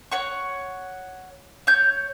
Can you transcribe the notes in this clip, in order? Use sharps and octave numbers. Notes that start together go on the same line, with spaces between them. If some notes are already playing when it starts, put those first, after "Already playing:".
C#5 F#5 C#6
C#5 G6